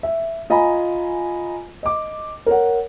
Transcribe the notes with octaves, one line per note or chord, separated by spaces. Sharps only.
E5
F4 D#5 G#5 A#5 B5
D#5 D6
A#4 C#5 F#5